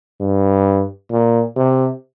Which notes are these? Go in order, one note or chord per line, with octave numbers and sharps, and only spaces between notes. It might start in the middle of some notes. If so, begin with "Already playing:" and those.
G2
A#2
C3